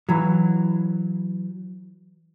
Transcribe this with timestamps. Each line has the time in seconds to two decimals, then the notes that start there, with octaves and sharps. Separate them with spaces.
0.09 E3 F#3